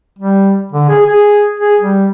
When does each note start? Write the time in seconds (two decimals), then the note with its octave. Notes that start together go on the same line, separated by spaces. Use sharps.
0.19 G3
0.72 D3
0.89 G#4
1.06 G#4
1.60 G#4
1.81 G3